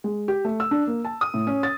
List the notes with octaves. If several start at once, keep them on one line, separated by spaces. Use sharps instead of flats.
G#3
G4
A3
E6
D4
A#3
A5
D#6
A2
C#4
A6